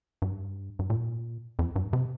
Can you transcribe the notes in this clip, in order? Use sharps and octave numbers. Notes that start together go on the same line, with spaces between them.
G2
G2
A#2
F2
G2
C3